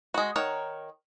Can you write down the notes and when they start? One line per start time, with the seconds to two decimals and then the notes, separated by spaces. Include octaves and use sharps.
0.14 G#3 F#4
0.36 D#3 A#4 C#5 F#5